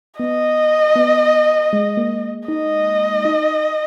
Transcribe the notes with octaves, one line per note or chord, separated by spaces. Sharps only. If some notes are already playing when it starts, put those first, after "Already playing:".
B3 D#5
B3
G#3
A#3
D#4 D#5
D#4